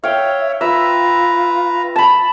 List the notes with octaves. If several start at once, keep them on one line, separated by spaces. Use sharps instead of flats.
C#5 E5 F5 G5
F4 B4 E5 A#5
A5 B5